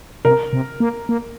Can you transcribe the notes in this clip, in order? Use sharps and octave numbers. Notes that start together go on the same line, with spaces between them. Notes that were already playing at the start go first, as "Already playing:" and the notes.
C3 A#4
C3
A#3
A#3